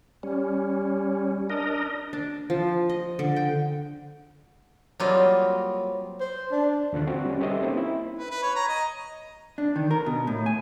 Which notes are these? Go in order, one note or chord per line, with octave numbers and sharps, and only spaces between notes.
G3 C#4
D4 A#4 D#5
D4
F3
D#5
D3
G5
F#3 G3 A#3 C4 F4 D#5
C5
D4
D#2 D3 F4 F#6
C4 F#4
G3 C#4
G4 A4 B4 C5 D#5 E5
A#3 C4 C#4 D#4
E4
B4
B4
C#5
A#5
D#5
D4
D#3
A#4
B2
A2
G#5